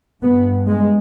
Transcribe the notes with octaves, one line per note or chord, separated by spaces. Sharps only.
G2 B3
G#3